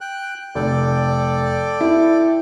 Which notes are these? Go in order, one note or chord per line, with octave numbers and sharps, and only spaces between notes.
G5 F#6
F1 A4 D5 G5
E4